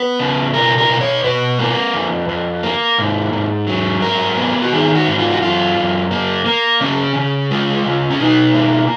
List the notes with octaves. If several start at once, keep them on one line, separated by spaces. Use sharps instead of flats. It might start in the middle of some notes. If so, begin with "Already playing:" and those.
Already playing: B3 B4
C#3
B2 A#4
A#4
B2
C#5
B2 B4
A#3
F2
F2
A#3
G#2
G#2
F#3
G#2 A#4
B3
F#4
D#3 G#4
F#4
G#2
F4
F#4
F#2 F4
F#2
A#3
A#3
C#3 C#4
C#3
G#3 F4
C#3
C#4
B2 D#4
A#3